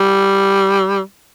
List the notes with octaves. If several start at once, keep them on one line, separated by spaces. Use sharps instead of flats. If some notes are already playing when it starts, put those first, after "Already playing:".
Already playing: G3